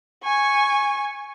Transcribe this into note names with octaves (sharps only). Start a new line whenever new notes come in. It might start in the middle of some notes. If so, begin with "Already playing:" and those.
G#5 C#6